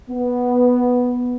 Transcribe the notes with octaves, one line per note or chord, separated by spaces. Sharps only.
B3